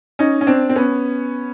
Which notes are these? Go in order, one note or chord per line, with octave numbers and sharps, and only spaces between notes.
C#4 D#4
C#4
C4 D4
C4
B3 C#4